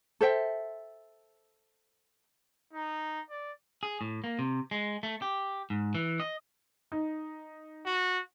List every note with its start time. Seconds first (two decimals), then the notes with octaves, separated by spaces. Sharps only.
0.21 A4 C5 E5 G5
2.73 D#4
3.30 D5
3.83 G#4
4.01 A2
4.24 A#3
4.39 C3
4.71 G#3
5.03 A3
5.22 G4
5.70 G#2
5.94 E3
6.20 D#5
6.92 D#4
7.86 F#4